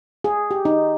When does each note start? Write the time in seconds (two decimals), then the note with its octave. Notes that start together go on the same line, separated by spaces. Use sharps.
0.24 G#4
0.51 G4
0.65 D#4